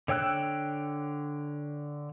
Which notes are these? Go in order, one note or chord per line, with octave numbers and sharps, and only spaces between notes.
D3 C#5 G5 E6 F#6